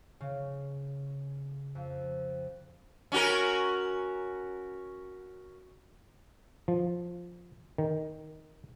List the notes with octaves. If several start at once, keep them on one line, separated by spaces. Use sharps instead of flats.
C#3
F2
C#4 F#4 A#4
F3
D#3